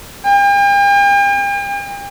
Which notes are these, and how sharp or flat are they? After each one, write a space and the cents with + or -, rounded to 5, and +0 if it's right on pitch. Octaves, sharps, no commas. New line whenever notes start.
G5 +45